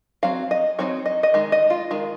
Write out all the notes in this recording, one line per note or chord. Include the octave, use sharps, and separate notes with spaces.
F#3 C4 F5
D#5
F#3 C4 D#4 C#5
D#5
D#5
D#3 G#3
D#5
F4
D#3 G#3